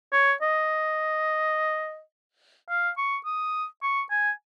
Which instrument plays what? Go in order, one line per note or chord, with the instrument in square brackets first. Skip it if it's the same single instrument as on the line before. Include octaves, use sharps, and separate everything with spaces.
[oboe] C#5
D#5
F5
C#6
D#6
C#6
G#5